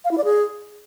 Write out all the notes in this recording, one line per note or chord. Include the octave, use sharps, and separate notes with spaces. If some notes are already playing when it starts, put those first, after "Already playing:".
F5
E4
D5
G#4